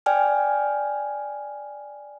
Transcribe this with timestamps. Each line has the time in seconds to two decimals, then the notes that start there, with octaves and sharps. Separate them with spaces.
0.06 D5 G5 G#5 F6